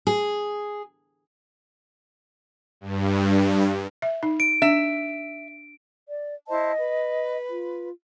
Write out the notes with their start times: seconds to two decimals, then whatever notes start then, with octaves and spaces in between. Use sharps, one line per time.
0.07 G#4
2.81 G2
4.02 E5
4.23 D#4
4.40 D7
4.62 D4 E5
6.09 D5
6.49 E4 C5 D#5 A5
6.78 B4
7.50 F4